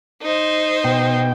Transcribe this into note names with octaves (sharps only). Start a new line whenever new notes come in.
D#4 C5
B2 G5